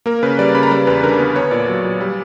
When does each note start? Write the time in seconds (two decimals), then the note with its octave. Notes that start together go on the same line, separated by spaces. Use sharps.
0.06 A#3 A#4
0.23 C#3 B4
0.39 G3 D5
0.54 C#3 B5
0.63 A#5
0.71 G3 D5
0.87 E2 B4
1.03 D3 A#4
1.19 B3 B4
1.36 B3 C#5
1.51 A#2 D5
1.68 F#3
1.84 A#2
2.01 G3